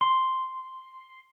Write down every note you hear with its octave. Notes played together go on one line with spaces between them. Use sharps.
C6